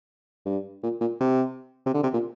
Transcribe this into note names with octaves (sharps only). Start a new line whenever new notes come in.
G2
A#2
A#2
C3
C3
D3
C3
A#2